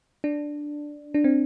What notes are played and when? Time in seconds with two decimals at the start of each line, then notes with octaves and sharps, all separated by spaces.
0.24 D4
1.14 D4
1.24 C4